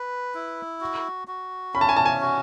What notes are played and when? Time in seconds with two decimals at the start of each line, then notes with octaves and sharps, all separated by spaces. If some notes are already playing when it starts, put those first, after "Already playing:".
Already playing: B4
0.35 E4
0.81 F#4
1.28 F#4
1.74 C#4 B5
1.81 A5
1.89 G#5
1.96 A5
2.05 G#5
2.21 F#4